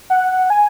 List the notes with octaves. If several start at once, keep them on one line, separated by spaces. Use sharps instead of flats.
F#5
G#5